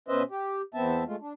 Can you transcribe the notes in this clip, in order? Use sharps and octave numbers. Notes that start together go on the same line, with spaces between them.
B2 C#4 B4 C5 D#5 E5
G4
E2 B3 C4 E5 A5
G#3 A3 F4
D4